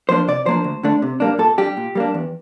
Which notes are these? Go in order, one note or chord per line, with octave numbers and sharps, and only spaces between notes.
F3 A#3 D4 C5
C3 D5
F3 A#3 D4 C5
D2
D3 A3 D4
C3
G3 A#3 D4
A#2 A4
G3 D4 G4
A#2
G3 A#3 D4
E2